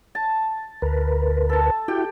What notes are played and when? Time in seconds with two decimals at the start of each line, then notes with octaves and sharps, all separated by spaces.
0.15 A5
0.82 D2 A#4 B4
1.49 A4 A5
1.88 E4 F#4 G4 G5